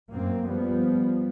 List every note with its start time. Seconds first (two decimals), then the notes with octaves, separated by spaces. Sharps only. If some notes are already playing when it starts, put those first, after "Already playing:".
0.10 F#2 A#3 C4
0.46 F3 G3 B3